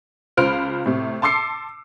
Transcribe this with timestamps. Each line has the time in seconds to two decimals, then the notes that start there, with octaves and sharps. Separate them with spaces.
0.37 C#2 F4 C5 B5 F6 D7
0.86 A2 C3
1.22 A5 C6 D6 E6 C7 C#7